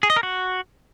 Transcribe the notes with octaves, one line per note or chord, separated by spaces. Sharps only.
G#4
D#5
A#4
F#4